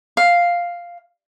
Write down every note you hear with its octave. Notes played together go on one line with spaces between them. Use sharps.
F5